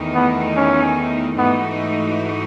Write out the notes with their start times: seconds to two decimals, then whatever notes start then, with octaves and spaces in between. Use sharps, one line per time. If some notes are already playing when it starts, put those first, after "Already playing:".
Already playing: E2 D#3 A3 D#4
0.14 B3
0.56 C#4
1.38 G#2 E3 A3 B3 D#4 F#4